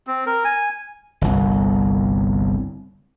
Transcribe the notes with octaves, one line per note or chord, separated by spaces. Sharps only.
C4
A#4
G#5
G1 C2